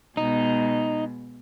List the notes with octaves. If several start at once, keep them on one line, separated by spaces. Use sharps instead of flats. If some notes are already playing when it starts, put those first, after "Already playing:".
B2 G#3 D#4